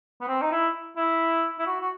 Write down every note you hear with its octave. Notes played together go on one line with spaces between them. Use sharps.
B3
C4
D#4
E4
E4
E4
F#4
F#4